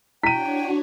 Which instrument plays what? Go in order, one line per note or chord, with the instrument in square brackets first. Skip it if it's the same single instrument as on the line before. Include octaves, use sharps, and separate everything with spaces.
[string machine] D4 F#4 C#5 [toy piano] E4 [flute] G5 [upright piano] B6 D#7